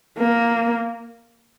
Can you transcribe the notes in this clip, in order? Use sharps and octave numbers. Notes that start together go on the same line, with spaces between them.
A#3